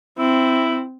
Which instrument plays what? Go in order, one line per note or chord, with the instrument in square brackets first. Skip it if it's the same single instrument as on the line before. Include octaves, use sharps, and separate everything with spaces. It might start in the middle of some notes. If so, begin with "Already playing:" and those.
[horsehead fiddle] C4 [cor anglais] E4